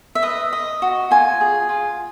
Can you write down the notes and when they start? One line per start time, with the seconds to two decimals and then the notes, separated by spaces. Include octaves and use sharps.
0.15 E5
0.23 B4 D#5
0.53 D#5
0.82 F#4
1.11 F4 G#5
1.41 G#4
1.69 F4